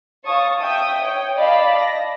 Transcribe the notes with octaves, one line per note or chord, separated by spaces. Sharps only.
C#5 F5 A5 C#6 D#6
E5 G5 D#6
C#5 G5
D5 D#5 F5 A5 B5 D6
A#6